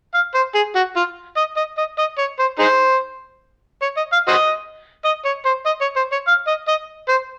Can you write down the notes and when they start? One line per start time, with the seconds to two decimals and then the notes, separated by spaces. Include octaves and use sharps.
0.14 F5
0.34 C5
0.55 G#4
0.75 F#4
0.96 F4
1.37 D#5
1.57 D#5
1.77 D#5
1.98 D#5
2.18 C#5
2.39 C5
2.59 D#4 G#4 C5
3.82 C#5
3.97 D#5
4.12 F5
4.28 F#4 C5 D#5
5.04 D#5
5.25 C#5
5.45 C5
5.66 D#5
5.81 C#5
5.96 C5
6.12 C#5
6.27 F5
6.47 D#5
6.68 D#5
7.08 C5